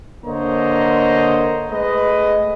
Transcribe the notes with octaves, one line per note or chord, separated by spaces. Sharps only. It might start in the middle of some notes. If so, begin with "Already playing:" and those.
D3 A#3 C5 C#5 D#5 A#5
G#3 A3 B4 D#5